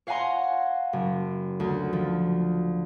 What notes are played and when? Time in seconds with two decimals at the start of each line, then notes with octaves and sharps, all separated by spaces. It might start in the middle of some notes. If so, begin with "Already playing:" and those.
0.07 C#5 F5 F#5 G#5 A#5 C6
0.93 F#1
1.60 D2
1.93 F3